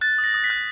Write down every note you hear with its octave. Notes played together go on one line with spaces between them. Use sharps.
F#6 A6
D#6
A#6
D#6
B6
F#6